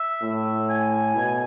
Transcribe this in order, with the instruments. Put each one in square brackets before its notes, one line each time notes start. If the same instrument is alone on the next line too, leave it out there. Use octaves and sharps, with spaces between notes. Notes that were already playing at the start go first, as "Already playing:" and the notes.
Already playing: [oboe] E5
[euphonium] A2
[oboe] G#5
[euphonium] B2